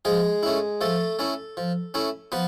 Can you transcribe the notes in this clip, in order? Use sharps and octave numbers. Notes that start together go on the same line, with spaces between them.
F3 G#3 G#4
A3 C#4 E4
F3 A3 A4
A3 C#4 E4
F3
A3 C#4 E4
F3 B3 B4